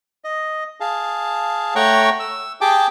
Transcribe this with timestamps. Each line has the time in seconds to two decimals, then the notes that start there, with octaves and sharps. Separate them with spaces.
0.24 D#5
0.80 G#4 F5 A5
1.75 A3 C#5 F#5 G5 A#5 C#6
2.20 E6
2.61 G4 G#4 G5 A5 D6